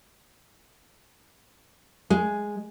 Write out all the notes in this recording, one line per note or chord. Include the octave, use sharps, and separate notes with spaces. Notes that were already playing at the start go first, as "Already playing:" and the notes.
G#3